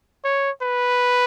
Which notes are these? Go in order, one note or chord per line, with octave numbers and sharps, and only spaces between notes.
C#5
B4